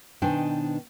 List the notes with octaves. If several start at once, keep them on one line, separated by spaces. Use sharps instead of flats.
B2 D#3 D4 C5 G5 G#5